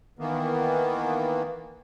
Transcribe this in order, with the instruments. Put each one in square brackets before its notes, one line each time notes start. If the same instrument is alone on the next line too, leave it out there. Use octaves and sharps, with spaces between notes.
[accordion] D#3 E3 A#3 B3